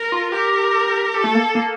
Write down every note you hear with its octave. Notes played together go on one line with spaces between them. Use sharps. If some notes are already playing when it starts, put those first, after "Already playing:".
Already playing: A#4
F4
G4 A#4
G4 A4
A3
A#3
A#3